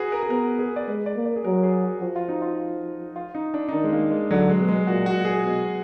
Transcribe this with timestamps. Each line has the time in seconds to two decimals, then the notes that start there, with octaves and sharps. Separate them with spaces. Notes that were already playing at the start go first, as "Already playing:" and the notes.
Already playing: F#4 G#4 B4
0.12 A#4
0.23 G#4
0.30 B3 A#4
0.59 G#4
0.76 D5
0.88 G#3 B4
1.06 D5
1.16 A#3
1.26 D5
1.36 G#4
1.44 F#3 A#4
1.63 G#4
1.83 F#4
2.02 F3 F#4
2.16 F4
2.29 D#4
2.42 F4
3.16 F4
3.35 D#4
3.54 D4
3.69 D#4
3.73 D#3 D4
3.84 G#3
3.93 A#3
4.11 G#3
4.30 D3 F#3
4.49 G#3
4.59 B2
4.69 G#3
4.87 A#2 F#4
5.06 F#4
5.16 A#2
5.25 G#4
5.44 B2